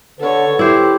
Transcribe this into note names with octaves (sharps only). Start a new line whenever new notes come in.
D3 A4 B4 C#5
E4 G4 C5